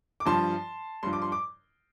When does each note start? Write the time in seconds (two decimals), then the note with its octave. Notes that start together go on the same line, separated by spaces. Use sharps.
0.20 D6
0.26 G2 F3 A5 C6
1.03 G2 F3 C6
1.13 D6
1.22 C6
1.32 D6